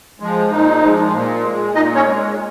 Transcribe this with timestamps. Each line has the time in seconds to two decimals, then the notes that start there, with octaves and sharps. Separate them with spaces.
0.20 F3 G#3
0.51 A#2 D#4
0.82 F3 G#3
1.13 A#2
1.43 G#3
1.74 A#2 D#4 D#5
1.95 C#4 C#5
2.05 G#3